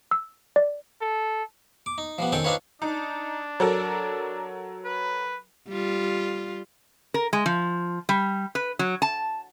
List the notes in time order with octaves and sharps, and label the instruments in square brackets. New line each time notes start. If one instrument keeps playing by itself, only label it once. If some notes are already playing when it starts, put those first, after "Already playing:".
[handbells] E6
D5
[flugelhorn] A4
[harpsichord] D6
D#4
F3 G3 B3
D#3 C4 C#4 A4 G5
C4 D4 D#4 F4 B4 C#5
[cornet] D4 [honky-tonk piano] D#4
[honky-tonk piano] F#3 A4 A#4
[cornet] B4
[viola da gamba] G3 F4
[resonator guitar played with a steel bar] A#4
G#3
F3
G3
B4
F#3
A5